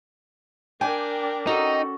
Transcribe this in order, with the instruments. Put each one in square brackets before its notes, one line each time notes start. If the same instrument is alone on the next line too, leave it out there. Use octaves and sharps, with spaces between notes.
[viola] D4 A#4 [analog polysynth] G5 D6 [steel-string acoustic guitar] G#5
[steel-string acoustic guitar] C#4 F#4 A4 [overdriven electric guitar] D#4